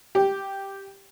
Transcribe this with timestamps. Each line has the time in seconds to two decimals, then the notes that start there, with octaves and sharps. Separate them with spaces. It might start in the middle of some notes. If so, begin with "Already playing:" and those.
0.15 G4